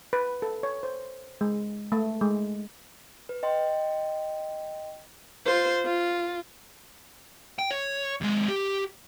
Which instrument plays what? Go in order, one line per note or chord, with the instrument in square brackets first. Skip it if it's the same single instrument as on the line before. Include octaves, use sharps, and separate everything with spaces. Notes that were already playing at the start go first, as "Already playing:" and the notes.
[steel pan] B4
A4
C#5
C5
G#3
A3
G#3
[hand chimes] B4
D#5 G5 C6
[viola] F4 C5
F4
[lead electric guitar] G5
C#5
D#2 G#3
G4